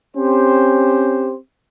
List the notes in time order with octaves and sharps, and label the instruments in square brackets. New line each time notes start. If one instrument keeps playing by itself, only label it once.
[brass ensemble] C4 C#4 G4 C5